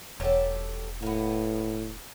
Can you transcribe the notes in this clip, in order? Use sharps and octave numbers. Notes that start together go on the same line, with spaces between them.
E1 F#3 G4 A4
A2 A#3 B3